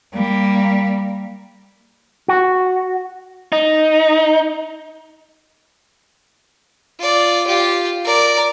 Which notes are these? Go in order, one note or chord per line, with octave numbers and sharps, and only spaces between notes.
G3 A#3
F#4
D#4
F4 D5
F4 G4
A#4 D5